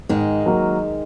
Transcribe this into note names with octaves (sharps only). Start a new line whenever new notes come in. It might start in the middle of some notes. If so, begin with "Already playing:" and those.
G#2 D#3 G#3
F#3 A#3 F#4 A#4